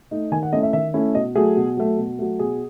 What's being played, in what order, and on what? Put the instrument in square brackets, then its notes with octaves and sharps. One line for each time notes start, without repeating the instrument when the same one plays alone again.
[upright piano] A3 D#4
D#3 G#5
F#5
A3 C#4 E4 D#5
E5
D#3 E5
A3 C#4 E4
B2 D#5
F#3 A3 G#4
B2
F#3 A3
B2
F#3 A3
B2 G#4